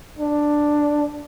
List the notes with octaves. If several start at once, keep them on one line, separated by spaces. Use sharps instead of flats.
D4